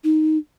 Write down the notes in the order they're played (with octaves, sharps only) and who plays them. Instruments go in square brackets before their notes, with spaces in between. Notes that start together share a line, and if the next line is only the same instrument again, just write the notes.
[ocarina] D#4